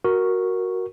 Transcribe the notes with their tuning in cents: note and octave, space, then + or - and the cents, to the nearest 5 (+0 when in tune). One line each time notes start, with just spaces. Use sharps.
F#4 +0 A#4 +0 C#6 -5